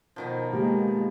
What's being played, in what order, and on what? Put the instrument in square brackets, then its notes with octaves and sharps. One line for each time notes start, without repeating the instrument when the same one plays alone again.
[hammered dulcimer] B2 D#3 F3
[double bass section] G#3 [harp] A#3 G4